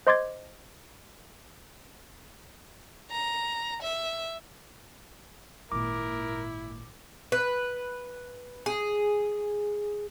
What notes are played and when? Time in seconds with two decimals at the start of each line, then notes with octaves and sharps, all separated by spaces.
0.07 C5 D#5 C6 D6 G#6 A6
3.11 A#5
3.82 E5
5.72 G#1 A#2 E4 A#4 D6
7.32 B4
8.66 G#4